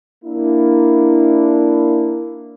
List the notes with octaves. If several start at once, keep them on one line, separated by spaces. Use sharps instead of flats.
A#3 D4 E4